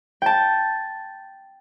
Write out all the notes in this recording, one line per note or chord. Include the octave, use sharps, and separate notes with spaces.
G5 A5